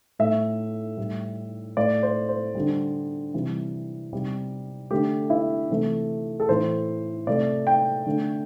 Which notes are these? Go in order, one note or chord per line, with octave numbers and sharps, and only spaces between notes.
A2 A3 E5
A2 G3
A2 A3 D5
C5
C5
D3 G3
C3 E3 G3
C3 G3
D3 A3 G4
E4
C3 E3 A3
A4
A2 E3 A3 C5
C3 A3 D5
G5
D3 A3